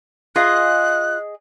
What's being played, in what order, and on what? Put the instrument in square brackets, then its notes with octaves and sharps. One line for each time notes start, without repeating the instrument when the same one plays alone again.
[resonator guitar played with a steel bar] F4 F5 [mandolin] G#4 D#5 [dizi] F#6